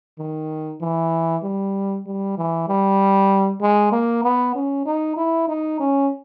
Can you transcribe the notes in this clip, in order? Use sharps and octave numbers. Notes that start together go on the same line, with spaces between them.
D#3
E3
G3
G3
E3
G3
G#3
A#3
B3
C#4
D#4
E4
D#4
C#4